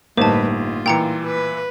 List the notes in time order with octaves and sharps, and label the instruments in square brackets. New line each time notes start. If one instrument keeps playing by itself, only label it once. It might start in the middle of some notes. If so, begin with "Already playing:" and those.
[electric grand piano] G1 [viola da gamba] A2 G3 B4 [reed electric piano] A#3 D#4 [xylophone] C5 A5
[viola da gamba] F4
[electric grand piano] A#2 E3 [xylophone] G5 A#5 C#7
[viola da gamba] B4